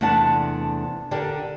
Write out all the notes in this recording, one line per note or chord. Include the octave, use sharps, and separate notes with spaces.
E2 C3 A3 D4 F#5 A5
D3 D4 G4 A#4